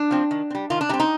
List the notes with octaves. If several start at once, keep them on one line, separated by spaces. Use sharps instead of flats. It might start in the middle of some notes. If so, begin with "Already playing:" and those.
Already playing: D4
F3 C4
D#3
C4
G3
D#3 F4
D4
G3 C4 D#4
D#4